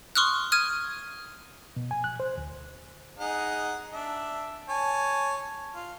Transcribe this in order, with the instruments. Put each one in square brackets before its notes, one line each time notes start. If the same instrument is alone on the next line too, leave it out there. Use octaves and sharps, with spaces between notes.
[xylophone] C6 C#6 D#6 F6 F#6
D#6 F6 G#6 D#7
[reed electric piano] B2
G#5
F#6
C5
D2
[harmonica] D#4 G#4 F#5
D4 E5
C#5 G#5 A5
F4